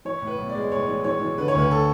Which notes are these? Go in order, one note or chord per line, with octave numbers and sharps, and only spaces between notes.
E3 C#5
A2
B4
B1
D5
G#3
A2 C#5
E3
E3 C#5
E3
D3 B4
C#5
D2 B4
A4